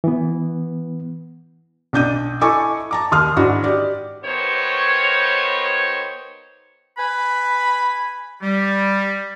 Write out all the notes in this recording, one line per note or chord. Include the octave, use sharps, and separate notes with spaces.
E3 B3
B1 D4 G6 D#7
E4 A4 D#5 G#5 C#6 D6
A5 A#5 D6
D#2 C6 D#6 F6
G#2 D4 E4 F#4
G4 D5
D#2 D#3 B3 C5 C#5
B4 G#5 B5
G3